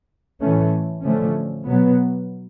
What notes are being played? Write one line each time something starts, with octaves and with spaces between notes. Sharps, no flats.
A2 E3 A3 C#4
D3 F3 A3 C#4
B2 F#3 B3